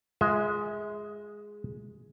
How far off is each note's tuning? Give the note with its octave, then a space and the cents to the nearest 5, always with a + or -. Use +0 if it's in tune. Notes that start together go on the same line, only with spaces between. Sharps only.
G#3 +0 F4 +0 E5 -40